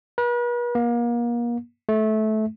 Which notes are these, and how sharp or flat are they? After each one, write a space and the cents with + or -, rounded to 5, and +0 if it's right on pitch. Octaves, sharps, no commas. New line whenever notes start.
B4 -40
A#3 +35
A3 -20